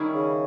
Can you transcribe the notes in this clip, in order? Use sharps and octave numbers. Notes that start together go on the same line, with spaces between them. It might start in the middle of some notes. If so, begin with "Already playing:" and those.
Already playing: D#3 G3 C#4 E4 G#4
C#3